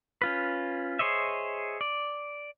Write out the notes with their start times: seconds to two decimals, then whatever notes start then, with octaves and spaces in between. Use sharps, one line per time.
0.22 C#4 F4 B4
0.99 G#4 C5 C#5 D#5 E5
1.81 D5